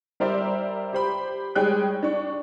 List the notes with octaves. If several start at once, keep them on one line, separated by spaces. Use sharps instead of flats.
G3 A#4 C5 D5 E5
G4 C5 B5
G3 G#3 G#4 C#5 G5 F#6
D4 C#6